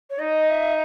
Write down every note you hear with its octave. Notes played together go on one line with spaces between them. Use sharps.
C#5
D#4 D#5
E5